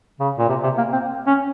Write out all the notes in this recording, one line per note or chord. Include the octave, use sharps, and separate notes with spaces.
C#3
A#2
C3
C3
A#3
C4
C#4